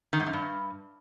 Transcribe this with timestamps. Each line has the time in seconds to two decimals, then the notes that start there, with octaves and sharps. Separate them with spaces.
0.13 D#3
0.20 G#2
0.26 F#2
0.33 G2